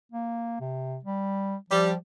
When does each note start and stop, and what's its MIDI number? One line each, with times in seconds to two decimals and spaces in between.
0.12 0.56 58
0.60 0.98 48
1.05 1.56 55
1.70 1.95 53
1.70 1.91 55